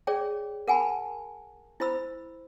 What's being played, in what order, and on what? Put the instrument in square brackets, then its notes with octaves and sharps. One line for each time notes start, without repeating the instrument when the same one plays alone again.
[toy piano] G#4 C#5 D5 G5
A#4 F#5 G#5 A5 B5
E4 C5 B5 E6